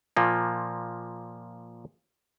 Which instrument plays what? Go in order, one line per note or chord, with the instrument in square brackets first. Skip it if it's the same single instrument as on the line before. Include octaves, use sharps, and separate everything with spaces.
[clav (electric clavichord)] A#2 F3 A#3